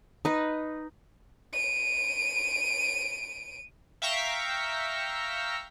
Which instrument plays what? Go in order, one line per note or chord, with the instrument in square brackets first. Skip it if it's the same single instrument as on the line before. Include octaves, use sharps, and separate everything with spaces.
[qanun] D#4 B4
[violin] D7 D#7
[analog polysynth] E5 F5 G5 A#5 C#6 B6